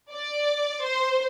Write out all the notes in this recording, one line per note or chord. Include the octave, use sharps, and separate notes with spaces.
D5
C5